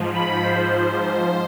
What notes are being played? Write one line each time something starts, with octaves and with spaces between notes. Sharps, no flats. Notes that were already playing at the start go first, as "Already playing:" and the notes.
Already playing: G#2 F3
B5
C5
C5